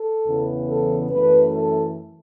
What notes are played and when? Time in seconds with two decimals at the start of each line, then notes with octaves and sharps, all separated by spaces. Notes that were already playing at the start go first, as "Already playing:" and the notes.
Already playing: A4
0.24 E2 C#3 E3 B3
0.67 A4
1.10 F#2 E3 A3 B4
1.53 A4